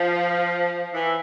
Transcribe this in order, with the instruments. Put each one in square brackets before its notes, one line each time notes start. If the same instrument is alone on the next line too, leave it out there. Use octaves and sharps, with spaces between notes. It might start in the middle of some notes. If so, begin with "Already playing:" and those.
Already playing: [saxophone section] F3
E3